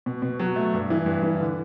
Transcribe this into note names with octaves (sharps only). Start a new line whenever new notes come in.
B2
B2
F#3
A3
G2
E3
G2
E3
D3